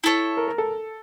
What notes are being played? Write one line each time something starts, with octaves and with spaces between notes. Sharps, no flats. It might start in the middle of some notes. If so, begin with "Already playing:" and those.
E4 A4 C#5
A#4
A#4
A4